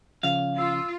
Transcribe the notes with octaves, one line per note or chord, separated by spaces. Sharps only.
C#3 F3 C#4 F5
F4 E6